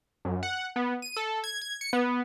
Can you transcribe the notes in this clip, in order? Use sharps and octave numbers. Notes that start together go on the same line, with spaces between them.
F#2
F#5
B3
D#7
A4
G#6
G#6
C#7
B3